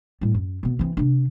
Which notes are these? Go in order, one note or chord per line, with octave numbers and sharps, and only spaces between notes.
A2 G3
F#2
B2 B3
E3 C4
C3 D4